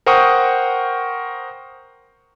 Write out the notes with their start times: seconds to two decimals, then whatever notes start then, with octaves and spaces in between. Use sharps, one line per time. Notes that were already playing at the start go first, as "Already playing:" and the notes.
0.06 A#4 C5 F#5 G5 C#6 D#6